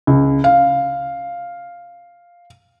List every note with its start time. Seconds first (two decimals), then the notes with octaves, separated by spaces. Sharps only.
0.07 C#2
0.44 F5